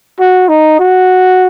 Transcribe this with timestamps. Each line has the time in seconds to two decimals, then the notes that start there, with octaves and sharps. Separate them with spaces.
0.19 F#4
0.48 D#4
0.79 F#4